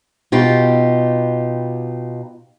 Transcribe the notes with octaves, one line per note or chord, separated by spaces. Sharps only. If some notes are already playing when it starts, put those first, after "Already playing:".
B2 D#4 F4 G4